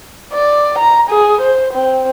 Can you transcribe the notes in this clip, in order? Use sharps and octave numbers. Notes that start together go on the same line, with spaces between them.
D5
A#5
G#4
C5
C4